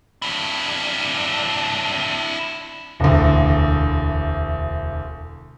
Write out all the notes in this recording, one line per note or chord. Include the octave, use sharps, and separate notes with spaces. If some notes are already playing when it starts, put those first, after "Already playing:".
D4 E4
E1 D2